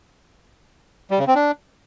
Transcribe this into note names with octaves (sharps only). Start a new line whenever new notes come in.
G3
C#3
C4
D4